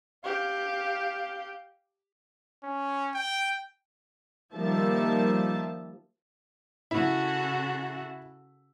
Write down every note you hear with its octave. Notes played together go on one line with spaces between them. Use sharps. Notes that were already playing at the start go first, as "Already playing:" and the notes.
G4 F5
C#4
G5
D#3 F3 G3 A#3 E5 A5
C#3 E4 F#4 A4